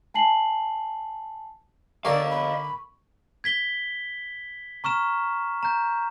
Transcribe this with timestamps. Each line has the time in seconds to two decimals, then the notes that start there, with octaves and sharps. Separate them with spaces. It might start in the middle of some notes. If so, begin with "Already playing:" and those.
0.14 G#5 A5 C7 F#7
2.05 D3 A#3 A#4 D5 D#5 F5 C#6
2.29 B5
3.44 G#6 B6 G7
4.84 A#5 C#6 F6 E7
5.63 A#5 G6